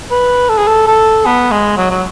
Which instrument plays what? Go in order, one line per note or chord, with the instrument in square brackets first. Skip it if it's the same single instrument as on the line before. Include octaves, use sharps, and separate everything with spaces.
[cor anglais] B4
A4
G#4
A4
A4
B3
G#3
F#3
F#3